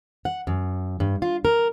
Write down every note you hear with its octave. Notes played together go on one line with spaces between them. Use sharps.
F#5
F#2
G2
F4
A#4